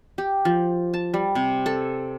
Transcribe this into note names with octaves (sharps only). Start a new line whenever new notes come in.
G4
F3
A5
G3
C3
A4